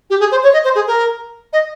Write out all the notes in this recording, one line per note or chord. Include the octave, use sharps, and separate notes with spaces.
G4
G#4
C5
C#5
D#5
C5
G#4
A#4
D#5